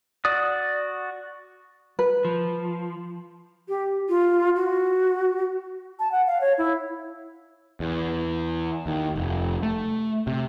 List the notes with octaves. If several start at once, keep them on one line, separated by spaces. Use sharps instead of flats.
F#4 D5 D#6
B4
F3
G4
F4
F#4
A5
F#5
F5
C#5
E4
E2
D#2
F1
A3
C3